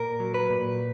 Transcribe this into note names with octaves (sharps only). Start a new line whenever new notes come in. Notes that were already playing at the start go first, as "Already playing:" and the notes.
Already playing: A#2 A#4
F#3
B4
A#2